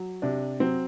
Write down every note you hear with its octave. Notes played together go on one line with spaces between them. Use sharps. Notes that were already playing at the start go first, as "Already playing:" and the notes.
Already playing: F#3
C3 D4
F#3 C4